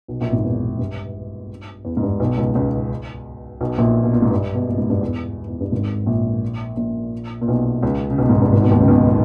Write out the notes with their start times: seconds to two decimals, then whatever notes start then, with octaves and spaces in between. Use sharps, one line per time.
0.08 B1 B2
0.21 A#1 A#2
0.32 G#1 G#2
0.44 E2
0.79 G2
1.85 E2
1.97 G#2
2.03 G2
2.20 B1 B2
2.38 C#2 C#3
2.55 C#2 C#3
3.61 B1 B2
3.78 A#1 A#2
4.03 B2
4.13 A#2
4.22 G#2
4.31 G2
4.55 B2
4.67 A#2
4.78 G#2
4.90 G2
5.01 E2
5.49 E2
5.61 G2
5.72 G#1 G#2
6.06 A#1 A#2
6.77 A#1 A#2
7.41 A#2
7.48 B1 B2
7.83 C#2 C#3
8.10 C#3
8.18 B1 B2
8.29 G#1 G#2
8.42 G2
8.53 G#1 G#2
8.62 B1 B2
8.71 D#2 D#3
8.80 C#2 C#3
8.88 B1 B2
9.06 A#2